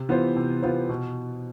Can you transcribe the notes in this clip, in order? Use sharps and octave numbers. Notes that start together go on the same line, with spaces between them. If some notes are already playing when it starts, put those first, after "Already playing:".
Already playing: C3
E3 B3 F4 C5
C3
E3 B3 F4 C5
B2